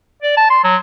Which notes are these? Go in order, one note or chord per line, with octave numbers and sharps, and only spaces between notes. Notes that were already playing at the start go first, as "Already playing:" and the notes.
D5
A5
C6
F#3